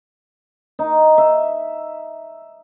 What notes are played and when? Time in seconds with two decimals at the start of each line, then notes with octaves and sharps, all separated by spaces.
0.79 D#4
1.18 E5